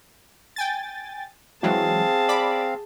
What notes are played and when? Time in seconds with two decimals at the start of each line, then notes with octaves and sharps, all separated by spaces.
0.56 G5 G#5 A6
1.63 E3 F#3 G#3 C4 G#4 F5 A5
2.28 D5 B5 D6